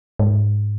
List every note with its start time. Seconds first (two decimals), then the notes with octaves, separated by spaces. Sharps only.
0.19 G#2